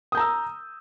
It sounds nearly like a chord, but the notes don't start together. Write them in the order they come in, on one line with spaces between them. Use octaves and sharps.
D#6 G6 A#5 E6